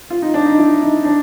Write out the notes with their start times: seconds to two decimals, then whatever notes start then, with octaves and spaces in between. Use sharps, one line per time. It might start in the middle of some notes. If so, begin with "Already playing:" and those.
0.10 F4
0.22 D#4
0.34 D4
0.46 D#4
0.58 E4
0.82 D#4
1.05 D4